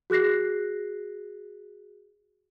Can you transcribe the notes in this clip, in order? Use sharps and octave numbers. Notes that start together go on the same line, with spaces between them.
F#4 G#4 F#6 A#6 C7